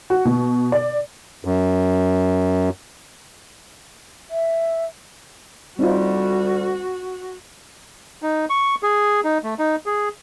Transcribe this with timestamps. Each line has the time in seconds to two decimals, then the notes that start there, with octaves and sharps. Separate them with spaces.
0.10 F#4
0.25 B2
0.72 D5
1.45 F#2
4.31 E5
5.79 D2 G3 C4 D#4 F4 F#4
8.23 D#4
8.50 C#6
8.83 G#4
9.24 D#4
9.44 A3
9.59 D#4
9.86 G#4